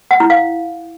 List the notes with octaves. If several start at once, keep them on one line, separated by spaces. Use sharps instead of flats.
F#5
E4
F5